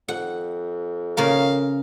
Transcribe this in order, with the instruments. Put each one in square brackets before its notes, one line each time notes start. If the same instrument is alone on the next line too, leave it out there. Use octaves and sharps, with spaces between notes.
[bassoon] F2 [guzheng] F#5
[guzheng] C#3 A#3 A#4 [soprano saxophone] F5